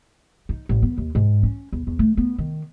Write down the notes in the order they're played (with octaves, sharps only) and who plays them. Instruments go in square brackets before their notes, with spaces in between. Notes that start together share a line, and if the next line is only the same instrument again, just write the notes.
[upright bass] D#4
A1
B3
D#2
G#2
C#4
E2
E2
A3
B3
D#3